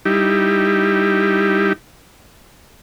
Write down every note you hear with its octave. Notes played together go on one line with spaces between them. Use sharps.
G3 D#4 E4 G4